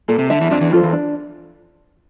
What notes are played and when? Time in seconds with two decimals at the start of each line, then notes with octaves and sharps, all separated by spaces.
0.08 A#2 A4
0.19 C3
0.30 D3 E5 A5
0.41 E2 E3
0.51 F2 F3 D4
0.61 E2 E3
0.72 F2 F4 A4 C5
0.83 E2
0.93 D4